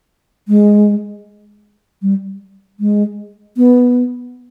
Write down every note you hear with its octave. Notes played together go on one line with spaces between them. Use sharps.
G#3
G3
G#3
B3